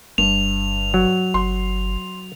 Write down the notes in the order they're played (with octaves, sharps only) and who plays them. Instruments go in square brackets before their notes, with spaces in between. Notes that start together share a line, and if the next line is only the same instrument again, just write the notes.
[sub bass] G1 [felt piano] G2 [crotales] F7
[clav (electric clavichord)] F#3
[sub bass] G1 [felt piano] C6